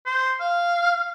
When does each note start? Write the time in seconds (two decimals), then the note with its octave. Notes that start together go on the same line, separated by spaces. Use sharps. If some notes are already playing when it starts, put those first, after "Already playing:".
0.06 C5
0.40 F5